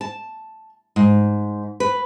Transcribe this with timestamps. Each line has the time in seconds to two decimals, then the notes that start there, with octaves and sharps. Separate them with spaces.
0.01 A5
0.96 G#2
1.80 B4